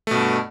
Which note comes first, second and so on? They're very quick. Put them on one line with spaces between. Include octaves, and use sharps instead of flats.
A3 B2 G2